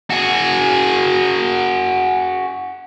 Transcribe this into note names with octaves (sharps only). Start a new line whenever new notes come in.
F#4 G#4